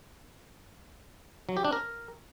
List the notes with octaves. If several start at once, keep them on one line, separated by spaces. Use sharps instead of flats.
F#3
G4
D4
A#4